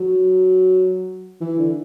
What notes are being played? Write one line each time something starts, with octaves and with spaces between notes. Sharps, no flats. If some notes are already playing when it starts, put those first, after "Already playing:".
Already playing: F#3
E3
D3